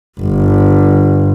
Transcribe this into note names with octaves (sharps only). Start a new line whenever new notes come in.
G1